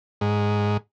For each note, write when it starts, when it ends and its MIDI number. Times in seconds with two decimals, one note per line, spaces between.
0.21 0.77 44